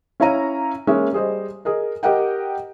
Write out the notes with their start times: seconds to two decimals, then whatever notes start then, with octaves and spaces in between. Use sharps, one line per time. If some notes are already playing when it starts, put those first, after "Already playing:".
0.20 C#4 E4 C#5 F5 A#5 D#7
0.87 G#3 A#3 C#4 E5
1.13 G3 G#4 C5 D#5
1.65 G#4 A#4 D#5
2.03 G4 A#4 D#5 F#5 G5